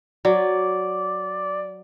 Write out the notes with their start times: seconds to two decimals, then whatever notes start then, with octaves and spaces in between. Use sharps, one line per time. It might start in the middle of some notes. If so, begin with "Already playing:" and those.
0.25 F#3 D5